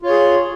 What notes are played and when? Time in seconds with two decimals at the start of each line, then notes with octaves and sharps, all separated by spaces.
0.02 F4
0.06 C#5
0.09 G#4